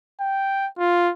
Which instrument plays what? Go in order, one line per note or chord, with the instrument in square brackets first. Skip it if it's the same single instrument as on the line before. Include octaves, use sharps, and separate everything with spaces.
[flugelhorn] G5
F4